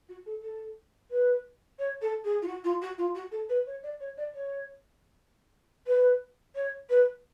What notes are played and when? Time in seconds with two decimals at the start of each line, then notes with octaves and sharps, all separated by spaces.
0.09 F#4
0.26 A4
0.43 A4
1.11 B4
1.79 C#5
2.02 A4
2.24 G#4
2.42 F4
2.47 F#4
2.64 F4
2.82 F#4
2.98 F4
3.15 F#4
3.31 A4
3.49 B4
3.67 C#5
3.83 D5
4.00 C#5
4.17 D5
4.34 C#5
5.87 B4
6.55 C#5
6.89 B4